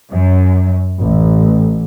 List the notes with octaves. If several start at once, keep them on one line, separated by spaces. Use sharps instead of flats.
F#2
A1